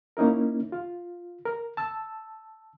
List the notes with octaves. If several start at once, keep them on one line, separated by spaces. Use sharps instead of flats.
A#3 C#4 D#4 E4 A#4
F4
A#4
A5 E6